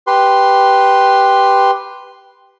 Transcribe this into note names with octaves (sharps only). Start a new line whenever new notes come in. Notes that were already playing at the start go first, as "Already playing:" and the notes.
G4 B4 C6